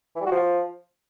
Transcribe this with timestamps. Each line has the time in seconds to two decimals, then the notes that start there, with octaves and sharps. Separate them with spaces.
0.16 E3
0.21 G3
0.26 F#4
0.32 F3